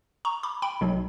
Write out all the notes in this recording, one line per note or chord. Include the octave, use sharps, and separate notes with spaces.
A#5 C#6
B5 D6
G5 B5
B1 B2 F#3